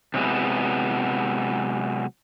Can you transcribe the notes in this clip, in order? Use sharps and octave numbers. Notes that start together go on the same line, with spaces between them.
C3 F#3 G#3 B3 E4